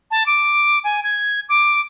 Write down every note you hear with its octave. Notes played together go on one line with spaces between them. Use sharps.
A5
D6
G#5
G#6
D6